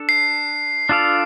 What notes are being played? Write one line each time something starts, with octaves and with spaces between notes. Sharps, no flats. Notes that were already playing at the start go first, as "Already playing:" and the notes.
Already playing: D4 A4
C7
D4 F4 A4 D5 F5